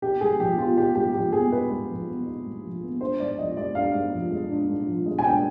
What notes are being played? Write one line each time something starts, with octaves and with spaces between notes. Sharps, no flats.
D#4 G4
G#2 G#4
F3 G4
B3 F4
D#4 G4
G#2 G4
F3 G4
B3 G#4
D#4 B4
G#2
F3
B3
D#4
G#2
F3
B3
D4 C5
G#2 D5
F3 D#5
G#3 D5
D4 F5
G#2
F3
G#3
D4
G#2
F3
G#3
G#5
D4 G5